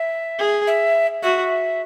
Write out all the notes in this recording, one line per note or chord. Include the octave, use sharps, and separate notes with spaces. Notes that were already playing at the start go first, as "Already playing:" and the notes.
Already playing: E5
G#4
E5
F#4 E5